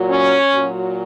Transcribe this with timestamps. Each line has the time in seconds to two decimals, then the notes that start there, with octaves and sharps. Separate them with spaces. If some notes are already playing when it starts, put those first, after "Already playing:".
Already playing: A#2 F#3
0.10 C#4
0.51 A#2 F#3